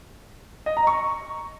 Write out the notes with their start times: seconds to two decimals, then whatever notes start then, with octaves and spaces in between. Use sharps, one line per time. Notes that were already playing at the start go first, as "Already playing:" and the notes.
0.66 D#5
0.77 A#5
0.87 C#6